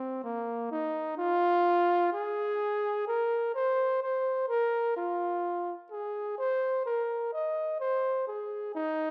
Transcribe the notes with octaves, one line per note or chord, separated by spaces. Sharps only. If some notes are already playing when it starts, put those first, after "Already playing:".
Already playing: C4
A#3
D#4
F4
G#4
A#4
C5
C5
A#4
F4
G#4
C5
A#4
D#5
C5
G#4
D#4